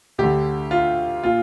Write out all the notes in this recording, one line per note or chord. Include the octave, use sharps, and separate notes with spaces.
D2 D3 G4
F4
A#2 F4